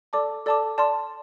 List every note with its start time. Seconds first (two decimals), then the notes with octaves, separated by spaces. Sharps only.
0.13 A4 D5 A5 D6
0.46 A4 D5 A5 D6
0.78 D5 A5 C6